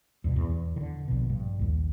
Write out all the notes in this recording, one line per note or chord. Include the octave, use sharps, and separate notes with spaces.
E2 G2 B2
E2
D3 D#3
A#1 B2
G2
A#1 D#2